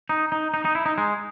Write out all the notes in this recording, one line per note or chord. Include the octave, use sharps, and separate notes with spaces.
D#4
D#4
D#4
D#4
E4
D#4
G#3